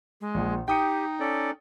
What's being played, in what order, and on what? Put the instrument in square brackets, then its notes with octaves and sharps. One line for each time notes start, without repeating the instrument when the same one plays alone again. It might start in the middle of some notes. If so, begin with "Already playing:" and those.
[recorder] G#3
[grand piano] A#1 A#2
[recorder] D#4 [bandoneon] G4 [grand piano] G5 D#6 C#7
[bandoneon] C#4 A4 D5